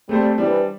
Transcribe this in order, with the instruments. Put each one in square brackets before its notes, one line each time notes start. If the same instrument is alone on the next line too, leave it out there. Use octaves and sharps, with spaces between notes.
[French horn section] G3 [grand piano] A3 C4 A4 C5
[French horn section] E3 [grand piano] G3 D4 C5